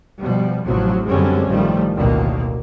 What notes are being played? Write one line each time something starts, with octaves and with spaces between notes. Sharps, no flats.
B2 F3 G3
A1 C3 F3 F#3
F#2 D3 G3 G#3 C4 C#4
A1 D#3 F3 G3 A3
A1 D2 B2 D#3 A#3